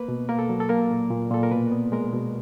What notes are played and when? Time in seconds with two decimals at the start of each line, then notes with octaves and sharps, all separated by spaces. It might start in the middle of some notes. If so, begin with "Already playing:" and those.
Already playing: A#3 B4
0.08 B2
0.29 A#3 A#4
0.39 A4
0.49 F#3
0.60 A4
0.69 A#3 A#4
0.91 A#2
1.10 A#2
1.30 A#2 A4
1.43 A#4
1.51 B2 B4
1.72 B3
1.92 G#3 A#4
2.13 B2